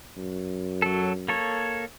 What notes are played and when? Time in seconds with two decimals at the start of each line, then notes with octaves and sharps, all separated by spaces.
0.17 F#2
0.82 F#3 A4
1.28 A#3 A4 C#5